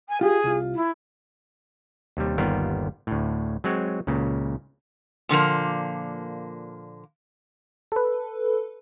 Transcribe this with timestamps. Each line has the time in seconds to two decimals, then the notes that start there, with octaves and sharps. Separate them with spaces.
0.09 G#5
0.21 F4 G4 G#4
0.44 C2 F4
0.74 E4
2.17 D#2 C3 G3
2.38 G1 D#2 G3 B3 F4 A#4
3.07 D2 A2
3.64 F#3 G#3 C4 C#5
4.07 C#2 A#2 C#3
5.29 A#2 D3 F3 A#3
7.92 A4 B4